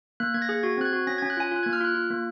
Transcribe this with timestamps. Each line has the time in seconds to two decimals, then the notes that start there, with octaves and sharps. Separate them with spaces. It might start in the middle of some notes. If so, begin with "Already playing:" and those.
0.20 A#3 F#6
0.34 A#3 G#6
0.42 A#6
0.49 G#4
0.63 F#4 G#6
0.78 C4 F#6
0.85 G#6
0.93 F#4
1.07 C#4 A#6
1.18 G#6
1.22 C#4
1.30 F#6
1.37 F4 G#5
1.51 F4 F#6
1.63 G#6
1.66 A#3
1.73 F6
1.81 F4 F#6
1.95 F4
2.10 A#3